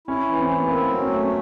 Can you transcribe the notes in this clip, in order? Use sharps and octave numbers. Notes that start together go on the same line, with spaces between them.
C#4 E4
E3
C4
E4
B3
A#3 C4
F#3
C#4
A3